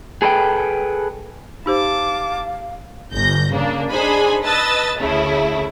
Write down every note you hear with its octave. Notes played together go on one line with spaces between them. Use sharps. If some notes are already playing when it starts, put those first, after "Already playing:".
G#4 A4 B4 E5 G5
D#4 G4 C5 F5 A5 D6
G1 G6 A#6
C#3 A#3 D4
D4 D#4 G#4 C5 G#5 B5
B4 D#5 A5 E6 A6
D2 C#3 A3 E4